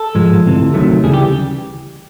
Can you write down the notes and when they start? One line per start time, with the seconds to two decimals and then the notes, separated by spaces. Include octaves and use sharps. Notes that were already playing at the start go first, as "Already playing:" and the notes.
Already playing: A4
0.15 G#2 F3 G#3
0.44 D2 C3 E3
0.74 D2 C3 D#3 F#3 A3
1.04 D2 C#3 E3 G3 G#4
1.14 G4